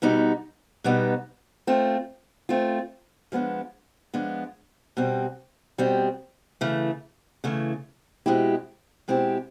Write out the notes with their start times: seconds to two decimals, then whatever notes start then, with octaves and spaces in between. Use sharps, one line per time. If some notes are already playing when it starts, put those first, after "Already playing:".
0.02 B2 G3 B3 D#4
0.84 B2 G3 B3 D#4
1.67 A3 C4 F4
2.49 A3 C4 F4
3.32 F3 G#3 B3 D4
4.14 F3 G#3 B3 D4
4.97 B2 G3 C4
5.78 B2 G3 C4
6.61 C#3 E3 A3
7.44 C#3 E3 A3
8.26 B2 G#3 C4 E4 G4
9.08 B2 G#3 C4 E4 G4